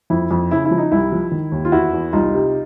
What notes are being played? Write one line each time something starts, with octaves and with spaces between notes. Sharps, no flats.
F2 E4
F2
C#3 E4
E4
F3
D#4
C2 E4
F3
D#3
D#2
F4
E2 E4 F#4
E2
C2 D#4 F4
C3